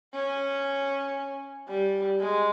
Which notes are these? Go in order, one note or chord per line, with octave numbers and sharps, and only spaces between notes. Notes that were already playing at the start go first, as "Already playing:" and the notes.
C#4
G3
G#3